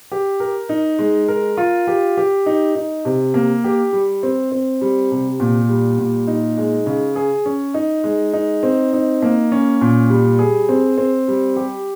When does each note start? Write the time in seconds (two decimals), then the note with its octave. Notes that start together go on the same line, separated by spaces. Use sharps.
0.12 G4
0.40 A#4
0.69 D#4
0.99 G#3
1.28 A#4
1.57 F4
1.87 G4
2.17 G4
2.46 D#4
2.75 D#4
3.05 C3
3.34 A#3
3.64 G4
3.92 G3
4.23 C4
4.52 C4
4.81 G3
5.11 C3
5.40 A#2
5.69 G3
5.98 A#2
6.27 D#4
6.57 G#3
6.86 C#3
7.16 G#4
7.46 C#4
7.74 D#4
8.04 G#3
8.33 D#4
8.63 C4
8.93 D#4
9.22 A#3
9.52 C#4
9.81 A#2
10.10 G3
10.39 G#4
10.69 C4
10.98 C4
11.28 G3
11.56 G4